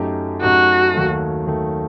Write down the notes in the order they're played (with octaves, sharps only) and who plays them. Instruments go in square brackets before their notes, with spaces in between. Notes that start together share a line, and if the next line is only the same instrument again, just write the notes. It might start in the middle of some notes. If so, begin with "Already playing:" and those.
Already playing: [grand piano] F#2 F#3 A3 D#4 G4
[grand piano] F#2 F#3 A3 D#4 G4 [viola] F#4
[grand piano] D#2 D#3 F#3 A3
D#2 D#3 F#3 A3